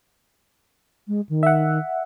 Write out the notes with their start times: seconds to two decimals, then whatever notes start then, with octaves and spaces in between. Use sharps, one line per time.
1.08 G#3
1.29 D#3
1.43 E5 F#5